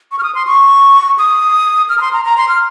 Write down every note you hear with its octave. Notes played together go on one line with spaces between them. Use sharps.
C#6
F6
D#6
C6
C#6
D#6
F6
A#5
C6
A#5
A#5
C6
F6